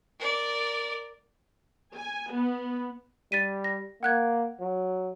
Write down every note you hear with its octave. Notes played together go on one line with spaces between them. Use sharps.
A#4 D5
G#5
B3
G3 A6 B6 D#7
A#6
A#3 F#5 F#6 G#6
F#3